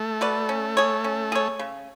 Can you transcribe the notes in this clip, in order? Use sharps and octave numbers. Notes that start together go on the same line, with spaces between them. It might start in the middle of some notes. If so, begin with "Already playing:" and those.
Already playing: A3
F#4 B4 D5
C#4
G#4 C#5
C#4
G#4 C#5
C#3